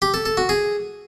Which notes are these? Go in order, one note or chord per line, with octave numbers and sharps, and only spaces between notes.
G4
A4
A4
F#4
G#4